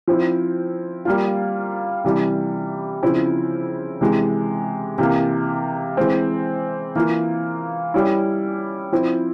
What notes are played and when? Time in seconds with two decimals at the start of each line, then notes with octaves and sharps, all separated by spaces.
0.07 F3 C4 E4
1.05 G3 A#3 F4
2.04 C3 E3 G3
3.03 C#3 F3 C4 E4
4.01 C3 E3 G#3
4.98 C3 E3 A#3
5.97 E3 G#3 C4
6.96 E3 A#3 F4
7.94 G3 C#4 E4
8.92 F3 C4 E4